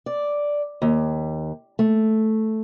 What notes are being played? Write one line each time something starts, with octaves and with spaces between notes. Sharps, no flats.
D5
D#2
A3